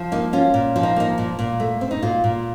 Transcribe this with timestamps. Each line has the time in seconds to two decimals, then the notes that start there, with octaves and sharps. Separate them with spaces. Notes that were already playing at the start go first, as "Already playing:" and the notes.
Already playing: F3
0.12 A#3 D#4
0.33 C#4 F4
0.54 A#2
0.76 F3 F4
0.83 D#4
0.96 A#3 D#4
1.18 A#2
1.39 A#2
1.60 A3
1.81 C4
1.91 D#4
2.02 A#2 F4
2.24 A#2